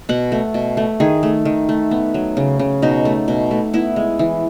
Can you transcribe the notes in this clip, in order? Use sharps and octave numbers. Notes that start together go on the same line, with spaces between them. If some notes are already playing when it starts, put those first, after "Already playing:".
B2 F#5
A3
B2
A3
D#3 G#4
A3
D#3
A3
B3
F#3
C#3
C#3
B2 D#4
A3
B2
A3
B3 E4
G#3
E3